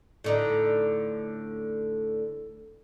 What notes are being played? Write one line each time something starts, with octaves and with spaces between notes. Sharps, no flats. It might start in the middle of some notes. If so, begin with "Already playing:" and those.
A2 D3 D#4